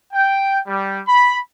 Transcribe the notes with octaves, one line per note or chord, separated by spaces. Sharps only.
G5
G3
B5